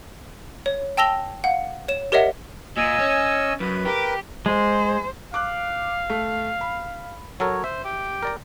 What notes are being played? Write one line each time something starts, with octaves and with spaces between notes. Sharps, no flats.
C#5
G5 A5 E6 A#6 F7 G7
F5 F#5
C#5 E7
G4 A#4 C#5 D#5 E5 F#5
A#2 D#5 G#5 E6
C#4
F#2 B4
G4 A#4 B4
G#3 C5
F5 D6 F#6
A3
B5
F#3 A4 A#4 C#5
C5 E5
G4
A#4 D5 A#5